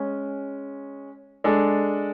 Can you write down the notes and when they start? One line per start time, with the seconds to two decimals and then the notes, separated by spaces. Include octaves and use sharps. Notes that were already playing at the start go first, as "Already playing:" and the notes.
Already playing: G#3 C#4
1.44 G#3 D4 A4